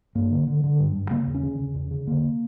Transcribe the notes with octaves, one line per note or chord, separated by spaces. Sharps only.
G2 A#3
D3
D3
D3
G2
G2
C#3 A#3
E2
C#4
C#3
C#3
E2
C#3
D3 A#3